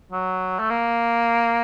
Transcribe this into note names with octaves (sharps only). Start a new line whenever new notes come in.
F#3
A3
A#3